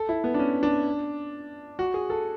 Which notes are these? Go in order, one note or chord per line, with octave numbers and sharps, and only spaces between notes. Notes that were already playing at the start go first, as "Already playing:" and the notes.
Already playing: A4
E4
B3
D4
C#4
D4
F#4
G#4
A4